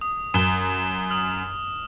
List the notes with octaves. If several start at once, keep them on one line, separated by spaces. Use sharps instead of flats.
D#6
F#2 E7 G7
D#6 F6